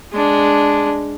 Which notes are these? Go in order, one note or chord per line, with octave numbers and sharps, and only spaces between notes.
G#3 D4